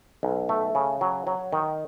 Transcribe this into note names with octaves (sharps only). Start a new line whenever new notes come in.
B1
A3
C#3
F#3
F#3
D#3